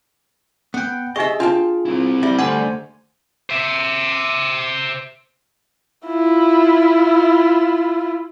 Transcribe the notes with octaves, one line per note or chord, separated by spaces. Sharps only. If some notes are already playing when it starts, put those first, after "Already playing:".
B3 F#5 G5
D#4 G4 G#4 D#5 E5 C#6
D4 F4 G5 A5
C4 E4
G3 E5
D3 A3 C5 D5 F#5 G#5
C5 E5
E4 F4